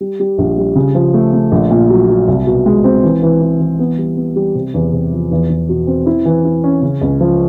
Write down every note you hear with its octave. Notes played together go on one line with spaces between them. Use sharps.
G3
G3
A#1
G3
C#3
F3
A3
A3
A#1
A#2
F#3
F#3
C2
B2
G#3
C4
E3
E3
E3
E3
B3
G3
B3
G3
C3
E2
C3
F3
E2
E2
B2
C4
E4
E3
E4
C#4
C#3
C#2
F3